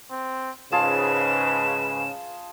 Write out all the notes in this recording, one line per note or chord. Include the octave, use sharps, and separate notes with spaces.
C4
G#2 C#3 F4 G#4 B4 A5 E7